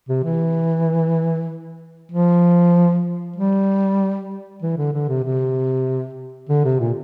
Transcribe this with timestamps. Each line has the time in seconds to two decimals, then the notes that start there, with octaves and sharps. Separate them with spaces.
0.09 C3
0.24 E3
2.12 F3
3.36 G3
4.62 E3
4.78 D3
4.93 D3
5.09 C3
5.24 C3
6.49 D3
6.64 C3
6.80 A#2